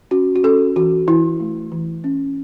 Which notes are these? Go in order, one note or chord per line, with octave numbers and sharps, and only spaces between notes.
C#4 F#4
F#4
C#4 A4
E3 F#4
E3 E4
A3
E3
C#4